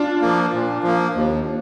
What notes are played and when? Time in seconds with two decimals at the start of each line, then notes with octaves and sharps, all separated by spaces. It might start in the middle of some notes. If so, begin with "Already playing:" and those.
Already playing: D4 F4
0.21 F3 A#3
0.53 A#2
0.83 F3 A#3
1.15 D#2